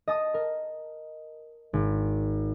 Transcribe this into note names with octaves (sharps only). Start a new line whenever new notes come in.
D#5 A5 D#6
A#4
G#1